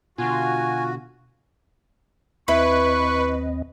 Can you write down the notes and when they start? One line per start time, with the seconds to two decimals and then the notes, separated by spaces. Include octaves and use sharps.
0.18 B2 D3 F4 F#4 G#5
2.48 D#2 C4 E4 B4 D#5 C#6